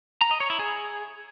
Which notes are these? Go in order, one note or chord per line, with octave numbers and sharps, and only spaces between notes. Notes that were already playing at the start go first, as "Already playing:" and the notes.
A#5
D#5
C#5
E4
G#4